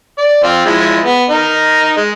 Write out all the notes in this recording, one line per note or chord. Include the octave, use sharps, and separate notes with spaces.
D5
F3 C4 F4
F3 G#3 E4
B3
D#4 A#4
G#3